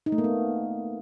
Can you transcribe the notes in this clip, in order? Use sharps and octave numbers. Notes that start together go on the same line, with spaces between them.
D#4
A3
A#3
B3